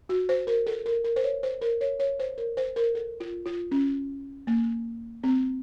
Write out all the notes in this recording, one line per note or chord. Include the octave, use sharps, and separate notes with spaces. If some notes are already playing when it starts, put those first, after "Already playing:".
F#4
C5
A#4
A4
A#4
A#4
C5
C#5
C5
A#4
C#5
C#5
C5
A#4
C5
A#4
A4
F4
F4
C#4
A#3
C4